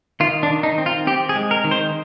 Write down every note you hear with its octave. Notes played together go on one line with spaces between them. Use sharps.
D#3 F4
D4
D#3
D#4
C4
F4
C4 G4
G#4
G#3
A#4
D#3
C5